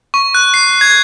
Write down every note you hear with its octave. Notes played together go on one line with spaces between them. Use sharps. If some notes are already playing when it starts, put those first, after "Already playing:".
C#6
F#6
C7
G#6